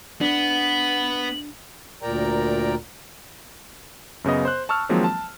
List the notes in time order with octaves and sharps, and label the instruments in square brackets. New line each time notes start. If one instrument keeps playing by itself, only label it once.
[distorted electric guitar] B3 [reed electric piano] D4 [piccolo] F#7
[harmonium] D2 A#2 A#4 D5 G5 A#5
[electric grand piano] F#2 C#3 B3 D#5
C5 F#6
A5 C#6 E6 F6
D#3 F3 F#3 G#3 A#3 C4
A5